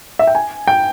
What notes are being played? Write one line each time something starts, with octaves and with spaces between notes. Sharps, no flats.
E5
G5
G#5
G5